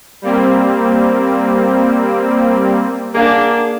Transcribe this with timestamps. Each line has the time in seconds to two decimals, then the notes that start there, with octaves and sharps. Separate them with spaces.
0.22 G3 A#3 C4
3.15 A#3 D4 G#4 F5 F#5